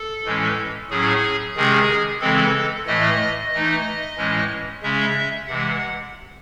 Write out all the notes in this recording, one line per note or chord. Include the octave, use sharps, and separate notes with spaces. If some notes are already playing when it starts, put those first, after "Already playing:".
Already playing: A4
A2 E3 G#3 C#4
A2 F#3 C#4 G#4
C3 D#3 G#3 C#4 G#4
C#3 E3 G#3 C4 A4
A2 E3 A3 D#5
E3 A3 D#4 D#5
A2 E3 G#3 C#4
C#3 G#3 C#4 E5
C3 E3 G#3 F#5